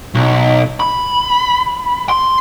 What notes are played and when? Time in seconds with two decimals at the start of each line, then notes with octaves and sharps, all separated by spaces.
0.15 B1
0.80 B5
2.09 C6